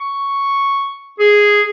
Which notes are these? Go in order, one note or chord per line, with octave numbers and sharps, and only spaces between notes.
C#6
G#4